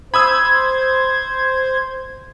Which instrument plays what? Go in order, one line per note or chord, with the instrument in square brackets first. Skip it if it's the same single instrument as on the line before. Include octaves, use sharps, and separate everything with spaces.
[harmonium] C5 [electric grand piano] B5 D#6 E6 [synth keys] G#6